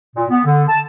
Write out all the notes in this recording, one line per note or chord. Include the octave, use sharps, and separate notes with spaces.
A#2
B3
D3
A5